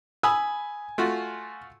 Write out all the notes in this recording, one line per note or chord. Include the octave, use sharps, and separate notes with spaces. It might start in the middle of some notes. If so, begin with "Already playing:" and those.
G#5 B5 D#6 E6
A3 F4 F#4